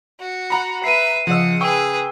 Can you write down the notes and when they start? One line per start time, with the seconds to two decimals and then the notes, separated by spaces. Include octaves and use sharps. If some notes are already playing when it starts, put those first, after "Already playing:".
0.20 F#4
0.50 F#5 A#5 B5
0.84 B4 E5 C7 D#7
1.27 C#3 F3 D#4 D#5 F#5 E6
1.61 G#4 B4 G5 C#6 E6